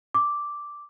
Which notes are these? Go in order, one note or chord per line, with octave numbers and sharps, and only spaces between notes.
D6